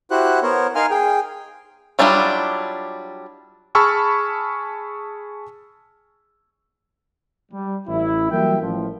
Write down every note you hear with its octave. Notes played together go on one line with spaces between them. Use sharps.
E4 F#4 G4 C5 F#5 F#6
B3 A#4 C5 C#5
D#4 A#4 F5 G#5 C6 F6
G#4 G5
F#3 G3 D4 E4 F4
G#4 A5 B5 C#6 E6 F6
G3
A1 E4
E3 F#3 G3 A#3 E5 G5
A1 F3